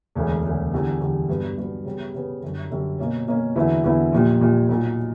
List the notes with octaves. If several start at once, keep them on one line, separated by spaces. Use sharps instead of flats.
E1 D2 C#3
E1 D2 C#3
E2 D3 G3
E2 D3 G3
G2 F#3 B3
G2 F#3 B3
C#3 G3 B3
C#3 G3 B3
F#2 D3 G3
F#2 D3 G3
B2 A#3 C#4
B2 A#3 C#4
E2 D3 F#3 B3 E4
E2 D3 F#3 B3 E4
A#1 A#2 G3
A#1 A#2 G3
B1 A#2 F#3